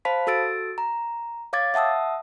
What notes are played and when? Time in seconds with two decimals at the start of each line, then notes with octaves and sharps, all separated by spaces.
0.05 C5 F5 A5 B5 B6
0.27 F#4 A4 E6 A6 D7
0.78 A#5
1.53 C#5 F5 D6 G#6 A6
1.74 E5 F#5 A5 D#6 E6